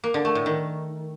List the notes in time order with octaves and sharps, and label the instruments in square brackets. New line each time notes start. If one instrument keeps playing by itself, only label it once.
[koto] A#3
D3
A3
A2
D#3